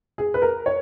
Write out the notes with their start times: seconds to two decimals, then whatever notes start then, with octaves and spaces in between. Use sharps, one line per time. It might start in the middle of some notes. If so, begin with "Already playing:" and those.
0.18 G#4
0.34 B4
0.42 A#4
0.66 C#5